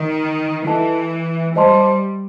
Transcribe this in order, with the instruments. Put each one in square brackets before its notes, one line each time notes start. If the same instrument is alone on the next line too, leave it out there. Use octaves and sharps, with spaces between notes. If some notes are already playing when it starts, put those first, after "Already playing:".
Already playing: [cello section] D#3
[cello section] E3 [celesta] E4 A4 D#5 A5
[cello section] G3 [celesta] C5 D#5 A5 C6